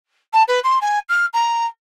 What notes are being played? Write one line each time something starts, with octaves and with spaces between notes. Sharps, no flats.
A5
B4
C6
G#5
F6
A#5